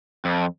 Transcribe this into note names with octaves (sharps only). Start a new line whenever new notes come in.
F2